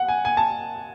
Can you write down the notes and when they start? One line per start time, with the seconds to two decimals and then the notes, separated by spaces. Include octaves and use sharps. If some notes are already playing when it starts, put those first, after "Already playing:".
Already playing: F#5
0.08 G#5
0.25 G#5
0.37 A5